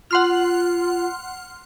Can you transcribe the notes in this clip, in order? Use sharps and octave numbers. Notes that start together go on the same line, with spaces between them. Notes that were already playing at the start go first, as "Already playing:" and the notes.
F4 F#5 C6 F6